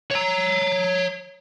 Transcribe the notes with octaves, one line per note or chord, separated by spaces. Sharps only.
C#5 A#5